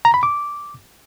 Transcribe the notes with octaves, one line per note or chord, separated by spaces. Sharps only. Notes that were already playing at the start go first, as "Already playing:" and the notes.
A#5
B5
D6